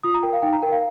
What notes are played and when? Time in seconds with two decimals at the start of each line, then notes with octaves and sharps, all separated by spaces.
0.03 F4 D#6
0.14 A#5
0.23 A#4 G5
0.33 F5
0.42 D#4 G5
0.53 A#5
0.62 A#4 G5
0.72 F5